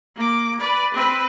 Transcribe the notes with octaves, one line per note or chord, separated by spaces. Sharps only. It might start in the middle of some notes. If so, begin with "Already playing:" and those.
A#3 D6
B4 D5
C4 B4